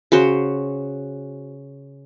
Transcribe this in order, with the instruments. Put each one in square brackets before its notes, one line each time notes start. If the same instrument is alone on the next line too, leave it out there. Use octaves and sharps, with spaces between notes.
[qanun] C#3 F#4 C5